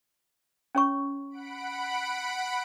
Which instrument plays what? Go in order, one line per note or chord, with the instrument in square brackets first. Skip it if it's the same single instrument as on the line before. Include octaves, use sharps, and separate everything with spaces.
[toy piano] C#4 C#5 C#6
[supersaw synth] F#5 B5 D7